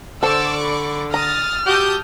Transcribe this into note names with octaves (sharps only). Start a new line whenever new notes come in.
D3 A4 C5 D5 C#6 D6 E6
B5
A#5 D#6 F6 A6
F#4 G4 A5 D#6 G6